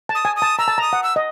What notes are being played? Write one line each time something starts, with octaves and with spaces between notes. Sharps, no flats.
A5
D#6
G#5
D#6
A5
A#5 E6
A5
A#5 D#6
F#5
E6
D#5